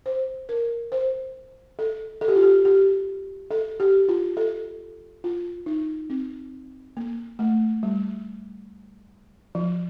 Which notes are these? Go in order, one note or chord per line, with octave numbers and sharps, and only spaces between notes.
C5
A#4
C5
A4
A4
G4
F4
G4
G4
A4
G4
F4
A4
F4
D#4
C4
A#3
A3
G3
F3